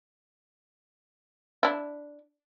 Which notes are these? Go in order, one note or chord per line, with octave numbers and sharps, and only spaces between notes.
D4 E4